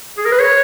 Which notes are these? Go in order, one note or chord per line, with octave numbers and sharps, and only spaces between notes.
G#4
A#4
B4
C#5